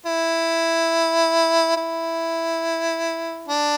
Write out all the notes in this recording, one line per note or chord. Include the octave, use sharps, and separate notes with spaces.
E4
E4
D4